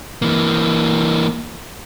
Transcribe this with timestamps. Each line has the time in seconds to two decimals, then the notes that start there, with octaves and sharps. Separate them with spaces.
0.22 E3 A#3